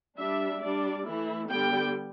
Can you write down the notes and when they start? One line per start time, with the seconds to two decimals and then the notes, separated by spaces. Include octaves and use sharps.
0.18 G3 D4 E5
0.62 G3 D4 D5
1.06 E3 A3 E4
1.51 D3 G3 B3 G5